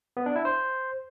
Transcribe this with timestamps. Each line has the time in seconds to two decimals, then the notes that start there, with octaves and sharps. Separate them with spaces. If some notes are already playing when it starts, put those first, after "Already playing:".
0.17 B3
0.26 D4
0.36 E4
0.45 C5